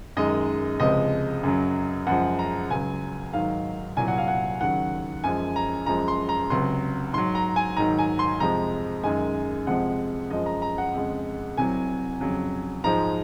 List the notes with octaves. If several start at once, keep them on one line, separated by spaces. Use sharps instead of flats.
F#2 D#3 G#3 D#5
C#2 C3 F3 G#3 D#5
F#2 C#3 F#3
F#2 C#3 F3 G#3 F#5
A#5
C#2 C#3 F#3 G#5
G#2 D#3 F#3 F5
C2 A#2 F#3 G#5
F#5
F5
F#5
D#2 C#3 F#3 F#5
F#2 F3 G#3 G#5
A#5
F#2 F3 G#3 A#5
C6
A#5
C#2 C3 F#3 C6
G#2 F#3 C6
A#5
G#5
G#2 D#3 F#3 A#5
G#5
C6
F2 C3 F3 G#3 A#5
F#2 D#3 G#3 G#5
F2 C3 F3 G#3 F#5
F#2 F3 G#3 D#5
A#5
A#5
F#5
F2 C#3 G#3
C2 C3 F#3 G#5
F2 C#3 F#3
G#2 F3 G#3 A#5